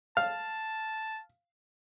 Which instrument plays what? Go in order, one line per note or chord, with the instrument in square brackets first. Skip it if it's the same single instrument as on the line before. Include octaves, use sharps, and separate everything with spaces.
[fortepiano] F5 [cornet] A5